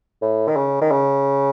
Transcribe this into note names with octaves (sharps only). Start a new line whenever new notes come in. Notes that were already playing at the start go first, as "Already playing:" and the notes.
A2
D#3
C#3
D#3
C#3